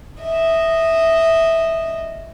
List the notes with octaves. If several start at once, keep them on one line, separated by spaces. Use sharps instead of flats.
D#5 E5